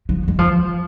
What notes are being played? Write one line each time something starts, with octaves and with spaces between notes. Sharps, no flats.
F3
G#3
F3